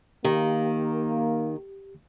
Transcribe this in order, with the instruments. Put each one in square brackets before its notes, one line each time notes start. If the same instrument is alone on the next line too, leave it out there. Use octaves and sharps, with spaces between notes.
[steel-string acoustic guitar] D#3 [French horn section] A#3 [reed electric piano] G4